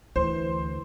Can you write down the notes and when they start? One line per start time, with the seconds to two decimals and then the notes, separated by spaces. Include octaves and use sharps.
0.16 D2 E3 C5